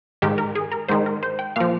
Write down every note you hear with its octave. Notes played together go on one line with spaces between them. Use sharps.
G#2 D#3 G4
A#4
G#4
A#4
G#2 D#3 C5
A#4
C5
G5
A#2 F3 F5